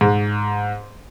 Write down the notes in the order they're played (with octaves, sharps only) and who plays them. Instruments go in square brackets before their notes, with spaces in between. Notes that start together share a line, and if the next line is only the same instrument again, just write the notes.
[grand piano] G#2